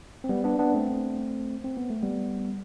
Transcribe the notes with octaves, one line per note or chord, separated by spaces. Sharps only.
C4
G3 B3
B3 D4
B3 D4
A3 C4
C4
B3
A3
G3 B3